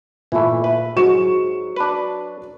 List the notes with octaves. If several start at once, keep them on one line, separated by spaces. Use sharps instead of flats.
A#2 E3 A3
B4
G#2 F#3 C#6 E7
D4 B4